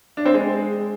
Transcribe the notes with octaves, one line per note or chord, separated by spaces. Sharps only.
D4
C4
G#3